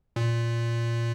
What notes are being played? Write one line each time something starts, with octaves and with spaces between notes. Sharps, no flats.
A#2